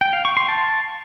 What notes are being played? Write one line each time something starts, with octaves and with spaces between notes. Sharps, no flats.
G5
F5
C#6
C6
A5